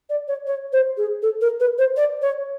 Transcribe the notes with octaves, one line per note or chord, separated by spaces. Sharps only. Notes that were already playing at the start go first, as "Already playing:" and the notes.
D5
C#5
C#5
C5
G#4
A4
A#4
B4
C5
D5
C#5